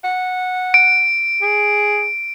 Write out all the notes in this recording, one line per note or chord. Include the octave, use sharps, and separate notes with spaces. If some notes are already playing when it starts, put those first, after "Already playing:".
F#5
D7
G#4